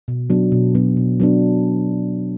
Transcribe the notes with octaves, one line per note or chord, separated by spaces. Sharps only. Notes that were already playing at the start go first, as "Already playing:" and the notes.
B2
F#3 B3 D4
B2
F#3 B3 D4
B2
F#3 B3 D4